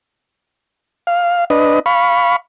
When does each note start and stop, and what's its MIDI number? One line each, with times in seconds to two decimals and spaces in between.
1.07 1.45 77
1.50 1.79 62
1.50 1.79 71
1.50 1.79 75
1.86 2.36 77
1.86 2.36 83
1.86 2.36 85